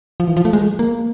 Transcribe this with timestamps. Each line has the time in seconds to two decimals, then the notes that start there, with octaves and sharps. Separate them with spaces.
0.20 F3
0.28 E3
0.37 F3
0.45 A3
0.53 G#3
0.79 A#3